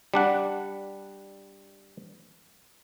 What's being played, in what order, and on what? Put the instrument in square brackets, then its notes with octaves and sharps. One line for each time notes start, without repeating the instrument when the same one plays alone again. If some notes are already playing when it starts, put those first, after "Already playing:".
[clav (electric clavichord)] G3 D4 F#5